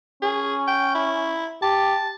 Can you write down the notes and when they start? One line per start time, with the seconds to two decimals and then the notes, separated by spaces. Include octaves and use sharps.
0.22 C#4 G#4
0.68 G5
0.95 E4
1.62 G4 A5